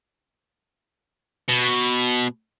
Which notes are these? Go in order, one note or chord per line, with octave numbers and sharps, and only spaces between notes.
B2